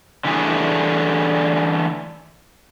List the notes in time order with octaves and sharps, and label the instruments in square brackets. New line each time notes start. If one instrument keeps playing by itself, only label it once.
[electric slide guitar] D3 E3 G3 A3 G#4